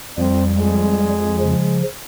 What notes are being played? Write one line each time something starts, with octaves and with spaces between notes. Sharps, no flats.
F2 G3 C4
G#3
C#3 F3